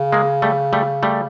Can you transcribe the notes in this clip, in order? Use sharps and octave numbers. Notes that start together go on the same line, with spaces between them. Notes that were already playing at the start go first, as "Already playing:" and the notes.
Already playing: C#3
G#3 A#3
G3 A3
G3 A3
G3 A3